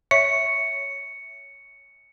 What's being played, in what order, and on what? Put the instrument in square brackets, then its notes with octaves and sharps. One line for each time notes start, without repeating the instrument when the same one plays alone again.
[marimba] C#5 E5 C#6 [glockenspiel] C#7